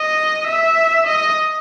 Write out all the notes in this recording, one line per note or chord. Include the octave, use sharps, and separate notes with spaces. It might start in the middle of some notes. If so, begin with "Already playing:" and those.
Already playing: D#5
E5
D#5